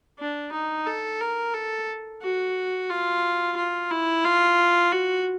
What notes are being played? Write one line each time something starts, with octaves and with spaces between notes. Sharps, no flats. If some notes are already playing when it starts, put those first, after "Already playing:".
D4
D#4
A4
A#4
A4
F#4
F4
F4
E4
F4
F#4